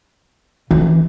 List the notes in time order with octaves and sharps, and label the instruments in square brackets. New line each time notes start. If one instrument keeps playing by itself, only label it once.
[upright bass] E3